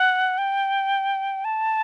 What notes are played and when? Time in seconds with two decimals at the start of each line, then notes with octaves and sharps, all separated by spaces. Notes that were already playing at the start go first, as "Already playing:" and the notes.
Already playing: F#5
0.38 G5
1.45 A5